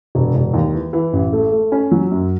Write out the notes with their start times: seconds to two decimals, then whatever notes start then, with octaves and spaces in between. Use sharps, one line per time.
0.15 E1
0.35 E1
0.54 D#2
0.74 E3
0.93 E3
1.13 A1
1.33 A3
1.52 A3
1.72 C#4
1.92 F#3
2.11 F#2